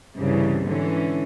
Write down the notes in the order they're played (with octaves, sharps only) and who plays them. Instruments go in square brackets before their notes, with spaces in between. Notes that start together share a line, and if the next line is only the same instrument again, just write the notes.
[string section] C2 G2 C#3 E3
G#2 D3 E3 C#4